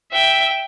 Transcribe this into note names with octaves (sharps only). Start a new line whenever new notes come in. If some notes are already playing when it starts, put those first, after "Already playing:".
E5 G5